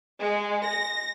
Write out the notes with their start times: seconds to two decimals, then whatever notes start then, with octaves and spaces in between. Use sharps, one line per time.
0.19 G#3
0.65 A#6